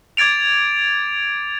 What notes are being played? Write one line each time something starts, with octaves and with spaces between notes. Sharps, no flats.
D6 G#6 A6 D7 F7